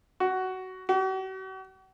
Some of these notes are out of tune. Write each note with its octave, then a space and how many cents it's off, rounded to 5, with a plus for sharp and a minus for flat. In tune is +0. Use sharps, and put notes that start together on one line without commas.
F#4 +15
F#4 +45